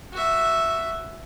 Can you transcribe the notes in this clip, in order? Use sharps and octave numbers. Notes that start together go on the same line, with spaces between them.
F#4 E5